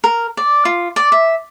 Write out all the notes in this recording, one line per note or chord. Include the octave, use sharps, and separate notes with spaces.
A#4
D5
F4
D5
E5